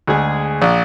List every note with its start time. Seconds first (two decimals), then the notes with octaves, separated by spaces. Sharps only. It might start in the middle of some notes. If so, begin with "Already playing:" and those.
0.07 D2 G#3 G#4
0.62 A#1